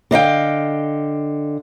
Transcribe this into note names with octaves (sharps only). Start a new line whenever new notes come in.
D3 D#5 F5 G5